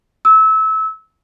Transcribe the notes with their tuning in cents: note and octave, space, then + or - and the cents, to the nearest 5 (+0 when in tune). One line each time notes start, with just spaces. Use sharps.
E6 -25